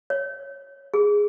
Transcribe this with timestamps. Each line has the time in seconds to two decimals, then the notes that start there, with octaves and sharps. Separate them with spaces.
0.10 C#5
0.94 G#4